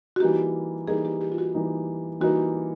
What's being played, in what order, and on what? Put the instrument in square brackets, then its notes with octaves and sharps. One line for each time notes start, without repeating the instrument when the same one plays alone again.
[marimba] F#4
[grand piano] E3 G3 A#3 D#4 [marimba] G4
[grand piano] E3 G3 A#3 D#4 [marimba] G#4
[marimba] G4
G4
F4
F#4
[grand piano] E3 G3 A#3 D#4
[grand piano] E3 G3 A#3 D#4 [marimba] F#4